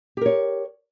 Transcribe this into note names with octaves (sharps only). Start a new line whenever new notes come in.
G4 A#4 C#5